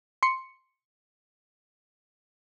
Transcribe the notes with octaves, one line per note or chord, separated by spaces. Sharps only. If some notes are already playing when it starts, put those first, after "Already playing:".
C6 C#7